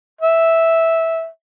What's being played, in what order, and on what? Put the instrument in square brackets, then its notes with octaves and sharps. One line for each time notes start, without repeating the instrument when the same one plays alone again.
[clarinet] E5